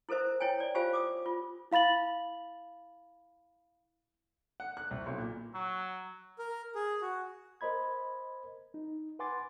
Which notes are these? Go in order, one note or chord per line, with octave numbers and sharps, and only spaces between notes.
E4 A4 A#4 C5 E5
E4 C#5 G5 G#5
D5
F4 G4 C5 F5 G#5
D6 D#6
F4
E4 F5 B5 A6 F#7
F#5
F#6
C2
B1
A#2
F#3
A#4
G#4
F#4
A#4 C5 D#5 B5 G#6
D#4
B4 F#5 G#5 C6 D6 A6